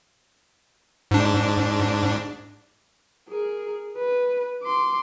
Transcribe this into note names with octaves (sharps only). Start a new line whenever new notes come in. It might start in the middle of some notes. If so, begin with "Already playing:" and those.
G#2 D4
G#4 A#4
B4
C6 D6